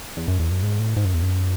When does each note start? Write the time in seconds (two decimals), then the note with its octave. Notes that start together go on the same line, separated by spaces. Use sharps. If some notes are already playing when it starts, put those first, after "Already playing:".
0.17 E2
0.28 F#2
0.40 E2
0.51 F#2
0.62 G#2
0.79 A2
0.96 G#2
1.05 F#2
1.14 E2
1.22 F#2